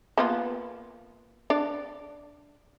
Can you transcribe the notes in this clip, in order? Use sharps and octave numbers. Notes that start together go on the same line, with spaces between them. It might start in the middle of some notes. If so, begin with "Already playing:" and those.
A#3 B3 F4
D4 D5